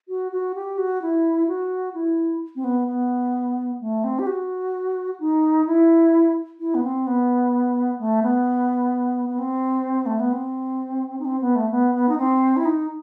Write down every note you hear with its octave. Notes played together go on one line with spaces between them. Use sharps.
F#4
F#4
G4
F#4
E4
F#4
E4
C4
B3
B3
A3
C4
G4
F#4
D#4
E4
E4
B3
C4
B3
A3
B3
B3
C4
A3
B3
C4
D#4
C4
B3
A3
B3
B3
D#4
C4
E4
D#4